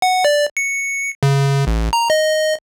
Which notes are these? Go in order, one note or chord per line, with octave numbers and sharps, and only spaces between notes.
F#5
D5
C#7
C#3
A1
A#5
D#5